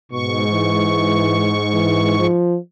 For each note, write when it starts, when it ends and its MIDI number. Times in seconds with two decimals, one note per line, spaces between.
0.12 2.27 44
0.12 0.46 47
0.12 2.27 85
0.51 1.60 52
1.74 2.18 52
2.19 2.58 53